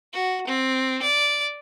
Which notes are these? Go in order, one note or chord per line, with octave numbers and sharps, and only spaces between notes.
F#4
C4
D5